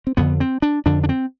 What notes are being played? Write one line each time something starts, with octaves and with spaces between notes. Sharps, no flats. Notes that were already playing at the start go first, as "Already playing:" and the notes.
C4
F2 D3 B3
C4
D4
F2 D3 D4
D4
C4